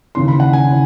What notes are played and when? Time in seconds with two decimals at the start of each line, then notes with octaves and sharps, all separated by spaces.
0.15 D#2 C#3 E3 C6
0.28 B5
0.40 F#5
0.53 G#5
0.65 C#3 E3